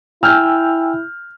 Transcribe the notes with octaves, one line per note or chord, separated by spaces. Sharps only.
E4 G5 G#5 E6 F6 G6